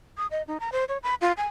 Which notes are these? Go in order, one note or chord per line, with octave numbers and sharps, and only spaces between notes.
D#6
D#5
D#4
A#5
C5
C#5
B5
F4
G#5